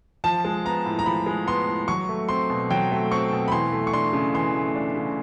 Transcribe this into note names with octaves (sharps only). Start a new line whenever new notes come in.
F3 A5
G#3
B3 A#5
A2
A#5
F3 B5
G#3
B3 C6
A2
F#3 C#6
A3
C4 C6
B2
F#3 G5
A3
C4 C#6
B2
B5
E3 C6
A3
C#6
D4 C6
C#3
E3 C6
A3
D4
C#3